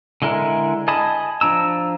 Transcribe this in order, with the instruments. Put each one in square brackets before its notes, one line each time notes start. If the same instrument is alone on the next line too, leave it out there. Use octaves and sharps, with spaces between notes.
[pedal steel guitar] D3 G#3 E4 A#4
D#5 G#5 A5 B5 D#6
F3 D4 A#5 E6